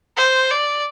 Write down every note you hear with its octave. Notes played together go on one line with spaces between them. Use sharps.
C5
D5